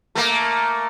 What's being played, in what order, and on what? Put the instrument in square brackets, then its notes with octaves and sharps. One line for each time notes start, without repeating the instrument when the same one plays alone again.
[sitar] A3 A#3